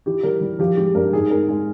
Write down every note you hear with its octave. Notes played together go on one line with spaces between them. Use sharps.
E3 G4
G3 A#4
G3
F3 G4
G#3 G4
G2 A#4
G#2 G#4
G#3 A#4
G#3 G#4